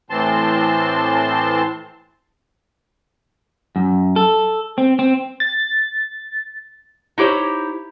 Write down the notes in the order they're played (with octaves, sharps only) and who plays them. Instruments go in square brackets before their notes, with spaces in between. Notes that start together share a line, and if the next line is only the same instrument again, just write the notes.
[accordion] A2 E3 C4 A5 C6
[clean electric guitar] F#2
A4
C4
C4
[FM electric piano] A6
[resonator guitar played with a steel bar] D#4 E4 G4 C5 C#5